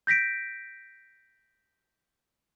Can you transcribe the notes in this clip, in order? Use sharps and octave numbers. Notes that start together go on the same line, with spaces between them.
G6 A#6 B6 D7